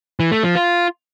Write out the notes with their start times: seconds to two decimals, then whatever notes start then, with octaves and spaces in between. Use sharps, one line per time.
0.20 E3
0.32 A3
0.43 F3
0.55 F4